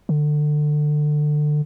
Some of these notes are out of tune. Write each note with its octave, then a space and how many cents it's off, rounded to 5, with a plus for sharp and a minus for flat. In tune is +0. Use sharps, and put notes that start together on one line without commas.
D3 +25